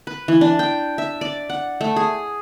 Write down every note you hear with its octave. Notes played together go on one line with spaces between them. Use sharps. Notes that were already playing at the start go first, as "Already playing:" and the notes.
B4
E3
D4
G5
E5
D5
F#5
A3
G#4